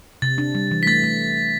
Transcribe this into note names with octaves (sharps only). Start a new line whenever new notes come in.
C3 A6
D4
G3
E3
B6
A3 A6
A3